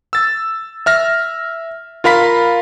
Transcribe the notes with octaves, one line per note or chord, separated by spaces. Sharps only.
E6 A6
E5 F6 A#6
F4 A#4 F5 B5 B6